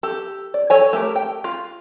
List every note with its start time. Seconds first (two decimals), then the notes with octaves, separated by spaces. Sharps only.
0.03 G4 A4
0.54 D5
0.70 A4 C#5 G#5
0.93 A3 G4 A#4
1.16 G5
1.44 F4